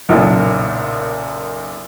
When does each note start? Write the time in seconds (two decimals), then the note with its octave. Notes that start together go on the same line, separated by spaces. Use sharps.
0.09 F#1 B1 F#2 A#2